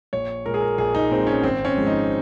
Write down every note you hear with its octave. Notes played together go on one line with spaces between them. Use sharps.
A#1 C#5
A#2 G#3 A#4
G#4
A#4
A#1 G#4
D#4
A#2 G#3 C4
C#4
G#1 C4
C#4
G#2 F3 G#3
D#4